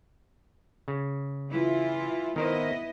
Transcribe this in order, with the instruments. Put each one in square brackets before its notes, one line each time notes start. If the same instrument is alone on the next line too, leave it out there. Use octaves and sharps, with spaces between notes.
[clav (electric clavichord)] C#3
[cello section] E3 E4 F4
[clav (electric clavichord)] D#3 A#4 C5 [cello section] B3 E4 D#5